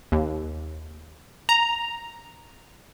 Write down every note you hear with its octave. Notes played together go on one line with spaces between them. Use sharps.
D#2
A#5